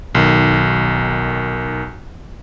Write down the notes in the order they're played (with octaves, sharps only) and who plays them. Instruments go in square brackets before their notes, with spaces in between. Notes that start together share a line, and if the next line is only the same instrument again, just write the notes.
[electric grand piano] B1 D#3